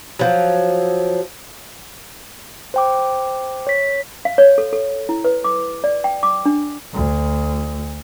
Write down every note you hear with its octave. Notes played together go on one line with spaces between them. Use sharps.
F3 F#3
C5 G5 D6
C#5 B6
F5
C#5
A4
A4
E4
B4
D6
D5
G5
D6
D4
D2